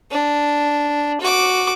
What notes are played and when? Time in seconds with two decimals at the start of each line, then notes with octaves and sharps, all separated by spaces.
0.11 D4
1.21 F#4 D6